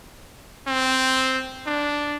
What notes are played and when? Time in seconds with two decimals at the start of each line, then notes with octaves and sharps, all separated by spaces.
0.67 C4
1.67 D4